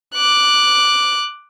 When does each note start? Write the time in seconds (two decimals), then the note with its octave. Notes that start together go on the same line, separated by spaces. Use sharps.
0.15 D6 F#6